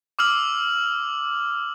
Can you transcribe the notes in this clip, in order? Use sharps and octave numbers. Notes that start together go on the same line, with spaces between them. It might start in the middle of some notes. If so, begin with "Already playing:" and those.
D6 E6 F6 F#7